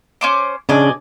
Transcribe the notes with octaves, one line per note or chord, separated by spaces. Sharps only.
C#4 C5 D6
C#3 D4 D5 D#5 G#5